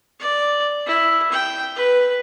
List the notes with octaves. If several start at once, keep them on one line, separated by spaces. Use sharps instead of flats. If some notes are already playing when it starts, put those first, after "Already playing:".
D5
E4
G5
B4